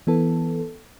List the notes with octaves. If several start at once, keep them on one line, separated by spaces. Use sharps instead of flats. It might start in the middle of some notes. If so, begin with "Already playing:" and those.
E3 B3 A4